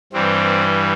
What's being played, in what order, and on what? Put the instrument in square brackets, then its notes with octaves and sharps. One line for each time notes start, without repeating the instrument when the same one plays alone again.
[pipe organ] G2 E3 G3 C4